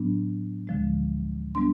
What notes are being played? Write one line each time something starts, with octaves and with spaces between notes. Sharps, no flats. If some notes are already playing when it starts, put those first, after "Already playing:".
Already playing: A2 F#3 B3 D4
D2 D3 F3 G#3
G3 B3 D4 C6